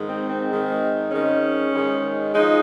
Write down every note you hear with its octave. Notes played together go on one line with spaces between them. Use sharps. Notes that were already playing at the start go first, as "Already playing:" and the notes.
Already playing: G#2 D#3 G#3
C4
C4
G#2 D#3 G#3
G#2 D#3 G#3 C#4
G#2 D#3 G#3
F3 G#3 D#4